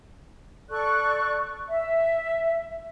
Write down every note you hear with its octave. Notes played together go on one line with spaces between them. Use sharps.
A4 D5 C#6 F#6
E5